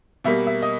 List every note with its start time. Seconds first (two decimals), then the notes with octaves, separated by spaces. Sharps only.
0.24 B2 G3 A#3 E5
0.47 E5
0.62 D#5